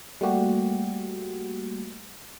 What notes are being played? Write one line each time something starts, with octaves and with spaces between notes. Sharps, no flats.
G3 A3 A#3 F#4 G4